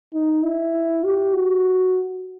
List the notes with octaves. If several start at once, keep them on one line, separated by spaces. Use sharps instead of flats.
D#4
E4
G4
F#4